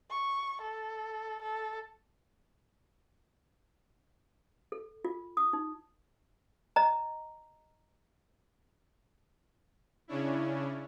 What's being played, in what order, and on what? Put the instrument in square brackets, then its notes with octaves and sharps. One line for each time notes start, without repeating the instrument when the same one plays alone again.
[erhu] C#6
A4
A4
[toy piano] A4
F4
D#6
D#4
D#5 A#5
[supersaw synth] C#3 C#4 D4 E4